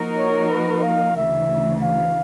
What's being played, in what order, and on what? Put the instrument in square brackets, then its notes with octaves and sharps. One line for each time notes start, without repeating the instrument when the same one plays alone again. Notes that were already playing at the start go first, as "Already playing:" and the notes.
Already playing: [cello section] F3 A#3 D#4 F#4 A#4
[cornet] C#5
B4
F5
[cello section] D2 C#3 E3 [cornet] E5
[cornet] F5